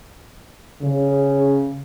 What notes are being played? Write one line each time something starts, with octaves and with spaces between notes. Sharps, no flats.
C#3